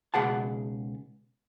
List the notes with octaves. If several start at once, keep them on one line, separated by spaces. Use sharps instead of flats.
C#2 B2 G#4 F#5 A5